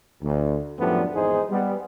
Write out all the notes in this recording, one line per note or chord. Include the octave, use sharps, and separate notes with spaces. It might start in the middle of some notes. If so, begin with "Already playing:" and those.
D2
F#2 A2 F3 G3 B3 D4
G#1 E2 G#2 D#4 G#4 C5
G3 B3